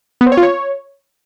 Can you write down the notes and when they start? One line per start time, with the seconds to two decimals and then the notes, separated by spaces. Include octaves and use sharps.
0.21 B3
0.26 C4
0.32 C#5
0.37 F4
0.43 C#5